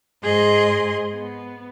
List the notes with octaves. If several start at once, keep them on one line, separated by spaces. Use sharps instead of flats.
G#2 G#4 D#5 C6
B3